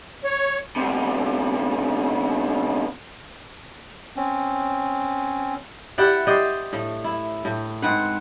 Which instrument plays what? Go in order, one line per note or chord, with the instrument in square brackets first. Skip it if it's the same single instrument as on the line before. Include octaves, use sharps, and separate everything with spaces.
[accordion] C#5
[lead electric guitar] D2 C3
[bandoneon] C4 C#4
[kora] E4 G4 D5 F#5
G4 C5 D5 D#5
A2
E4
A2
G#2 C4 B4 F#5